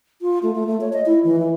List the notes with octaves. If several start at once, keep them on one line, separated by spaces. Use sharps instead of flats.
F4
A3
A3
A3
C#5
D#5
E4
E3
E3